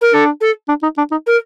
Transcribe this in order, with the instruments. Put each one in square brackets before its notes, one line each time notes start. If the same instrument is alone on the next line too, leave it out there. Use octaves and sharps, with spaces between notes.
[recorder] A#4
[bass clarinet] D4 [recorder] A4
[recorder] A4
[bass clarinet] D4
D#4
D4
D#4
[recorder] A#4